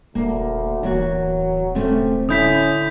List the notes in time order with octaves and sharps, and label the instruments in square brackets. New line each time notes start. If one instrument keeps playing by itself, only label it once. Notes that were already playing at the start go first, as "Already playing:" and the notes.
[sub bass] D#1 [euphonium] D2 [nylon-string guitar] A#3
[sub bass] D1 [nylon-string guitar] E2 A#3 F#4 [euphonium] F#3
[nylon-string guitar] C3 A3 C#4 [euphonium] C4
[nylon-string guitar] D3 E4 [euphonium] C#4 [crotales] D#6 G6 B6